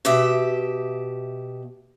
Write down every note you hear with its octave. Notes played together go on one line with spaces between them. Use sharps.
B2 G4 E5